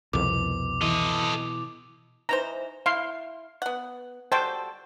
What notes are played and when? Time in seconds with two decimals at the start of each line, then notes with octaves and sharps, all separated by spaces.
0.13 C2 F2 B2 D6
0.82 E3 A4 D#5
2.29 E3 D#4 C5 A#5
2.86 E4 F5 C6
3.62 B3 F#5
4.32 G3 F#4 A4 C5 G5